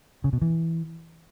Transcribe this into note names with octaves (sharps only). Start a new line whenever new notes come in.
C#3
B2
E3